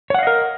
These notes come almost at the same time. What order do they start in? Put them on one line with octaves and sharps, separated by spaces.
C#5 F#5 F5 D#5 A#4